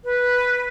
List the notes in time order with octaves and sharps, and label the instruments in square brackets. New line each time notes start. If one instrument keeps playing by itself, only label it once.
[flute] B4